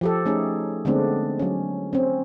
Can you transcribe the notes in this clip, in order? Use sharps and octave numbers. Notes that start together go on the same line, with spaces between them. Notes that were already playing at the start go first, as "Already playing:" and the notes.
F3 G4 A4
A3 C#4 D#4 G#4
D3 G#3 A3 B3 C4 D4
F#3 C#4
C4 C#4